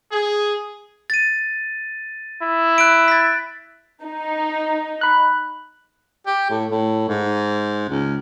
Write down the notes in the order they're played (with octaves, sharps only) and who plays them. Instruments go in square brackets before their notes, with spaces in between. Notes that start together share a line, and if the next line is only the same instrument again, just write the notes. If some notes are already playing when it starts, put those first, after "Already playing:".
[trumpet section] G#4
[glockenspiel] A6 D#7
[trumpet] E4
[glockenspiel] F#6 D7
A6 B6
[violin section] D#4
[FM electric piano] B5 F#6
[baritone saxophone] G4
A2
A2
G#2
C#2